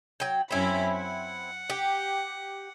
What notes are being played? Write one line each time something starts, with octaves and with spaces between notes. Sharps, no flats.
F#3 G5
F#2 C4 C#4 E4 B5
F#5
G4